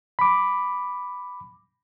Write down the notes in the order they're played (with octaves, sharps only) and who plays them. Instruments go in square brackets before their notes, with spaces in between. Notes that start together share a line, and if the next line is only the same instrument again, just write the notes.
[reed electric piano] B5 D6